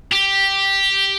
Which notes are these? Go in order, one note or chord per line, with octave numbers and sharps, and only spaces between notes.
G4